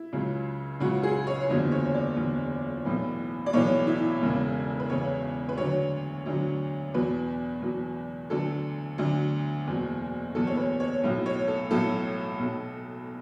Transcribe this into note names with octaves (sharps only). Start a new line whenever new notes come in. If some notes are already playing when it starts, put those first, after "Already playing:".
Already playing: E4
C#2 C#3 F#3
C#2 C#3 F#3 F#4
G#4
C#5
F#1 E2 D3 F#3
C#5
D5
F#1 E2 D3 F#3
B1 A2 E3
D5
B1 A2 E3 C#5
E4
E1 E2 C#3
B4
E1 E2 C#3 C#5
B4
D2 D3 F#3 C#5
D2 D3 F#3
E2 B2 F#3 B4
E2 B2 F#3
D2 D3 F#3 A4
D2 D3 F#3
F#1 E2 B2 F#3
F#1 E2 B2 F#3 A4
C#5
B4
C#5
B1 A2 F#3
C#5
A4
B1 A2 F#3 A4
B1 B2 F#3